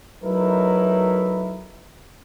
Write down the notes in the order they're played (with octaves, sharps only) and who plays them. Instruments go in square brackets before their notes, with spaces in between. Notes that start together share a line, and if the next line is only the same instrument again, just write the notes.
[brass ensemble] F#3 A3 D#4 E4 A#4 B4